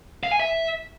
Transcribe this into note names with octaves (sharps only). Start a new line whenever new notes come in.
F5
G#5
E5